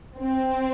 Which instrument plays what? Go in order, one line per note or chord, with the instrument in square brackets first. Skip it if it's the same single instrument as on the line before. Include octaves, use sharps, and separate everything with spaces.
[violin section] C4